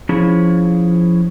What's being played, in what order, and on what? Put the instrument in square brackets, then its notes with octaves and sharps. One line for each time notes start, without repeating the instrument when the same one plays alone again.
[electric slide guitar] F3 C#4 E4 G#4